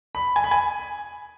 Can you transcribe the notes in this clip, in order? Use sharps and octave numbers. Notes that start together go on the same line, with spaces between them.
B5
G#5
B5
G#5